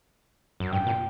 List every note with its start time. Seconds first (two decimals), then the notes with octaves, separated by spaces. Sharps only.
0.60 F#2
0.72 G2 G5
0.87 A#2